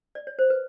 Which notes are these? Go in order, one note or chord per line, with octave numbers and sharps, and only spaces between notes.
D5
C#5
C5
B4